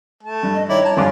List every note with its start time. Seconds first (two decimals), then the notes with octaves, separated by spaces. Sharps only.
0.23 A3 A5
0.43 G2
0.55 D#5
0.69 D#3 E4 C#5 D5
0.85 A5 A#5
0.97 G1 G2 F4 G#4 D6